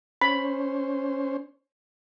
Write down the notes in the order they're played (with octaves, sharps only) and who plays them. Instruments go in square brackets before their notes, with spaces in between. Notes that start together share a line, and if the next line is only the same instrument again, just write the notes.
[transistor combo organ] C#4 C5 [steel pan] B5